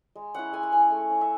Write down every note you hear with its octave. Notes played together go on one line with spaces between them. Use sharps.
G#3
C#4 E4 F#5
G#3 G#5
F#5
C#4 E4 G#5
A3
C#4 E4
E5